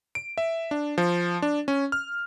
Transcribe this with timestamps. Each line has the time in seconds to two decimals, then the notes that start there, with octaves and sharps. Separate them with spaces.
0.15 D7
0.38 E5
0.71 D4
0.98 F3
1.42 D4
1.68 C#4
1.92 F6